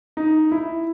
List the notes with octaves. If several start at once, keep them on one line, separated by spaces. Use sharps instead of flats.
D#4
E4